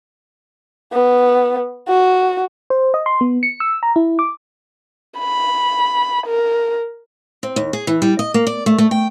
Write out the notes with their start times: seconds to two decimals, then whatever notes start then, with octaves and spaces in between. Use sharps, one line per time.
0.93 B3
1.88 F#4
2.70 C5
2.94 D#5
3.06 C6
3.21 B3
3.43 C#7
3.60 E6
3.83 A#5
3.96 E4
4.19 D6
5.18 B5
6.26 A#4
7.43 C4
7.56 D#2
7.73 G#4
7.87 E3
8.02 G3
8.19 D#5
8.34 A#3
8.47 D5
8.66 A3
8.78 A3
8.91 G5